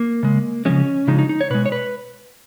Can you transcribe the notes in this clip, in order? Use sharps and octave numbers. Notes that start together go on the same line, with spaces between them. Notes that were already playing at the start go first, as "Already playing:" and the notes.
Already playing: A#3
C#3 G#3
C#3 F3 G#3 C#4
C#3 F3 G#3 D#4
D#4
D#4
C#5
B2 G#3 B4
C#5
B4